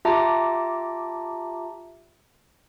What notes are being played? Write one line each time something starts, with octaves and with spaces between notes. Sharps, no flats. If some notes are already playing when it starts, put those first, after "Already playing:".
F4 G4 E5 A5 A#5 D6